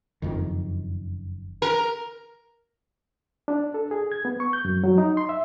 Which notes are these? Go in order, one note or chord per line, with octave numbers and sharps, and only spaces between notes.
F#1 F2 D#3
A#4
D4
A4
G#4
G#6
B3
C#6
G6
F#2
F#3
D#4
C6
E5